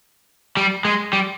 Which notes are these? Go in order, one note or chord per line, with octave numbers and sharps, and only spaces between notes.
G3
G#3
G3